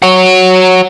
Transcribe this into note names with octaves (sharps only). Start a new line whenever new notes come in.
F#4 C#5